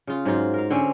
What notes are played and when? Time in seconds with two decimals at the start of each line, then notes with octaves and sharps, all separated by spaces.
0.07 C#3 F4
0.25 G#2 F#3 F4 C5
0.54 A#4 F5
0.70 D3 C4 C#4